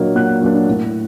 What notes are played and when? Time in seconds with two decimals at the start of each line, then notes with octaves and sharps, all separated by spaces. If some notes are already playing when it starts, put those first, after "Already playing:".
Already playing: A#2 F#3 A#3 D4 D#5
0.16 A#2 F#5 F#6
0.41 F#3 A#3 D4
0.68 A2